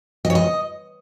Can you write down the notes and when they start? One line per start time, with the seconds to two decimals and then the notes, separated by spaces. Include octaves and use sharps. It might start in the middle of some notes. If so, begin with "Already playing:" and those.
0.25 D#5
0.30 C#5
0.35 D#5